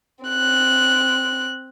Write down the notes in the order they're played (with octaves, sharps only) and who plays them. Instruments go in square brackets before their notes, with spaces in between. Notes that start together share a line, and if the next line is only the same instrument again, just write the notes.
[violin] C4 F#6